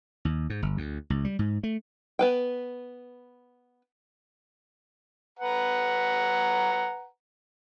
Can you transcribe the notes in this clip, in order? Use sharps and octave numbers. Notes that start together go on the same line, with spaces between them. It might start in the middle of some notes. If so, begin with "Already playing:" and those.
D#2
G#2
G1
D2
C#2
G3
G#2
A3
B3 B4 G5
B4 F#5 A#5